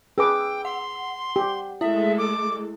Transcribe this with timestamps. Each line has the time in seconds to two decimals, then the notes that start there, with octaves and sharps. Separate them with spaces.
0.18 G#4 B4 G5 D6 E6
0.65 F#5 C6
1.36 G4
1.81 G#3 A3 E4 A4 E5
2.18 D6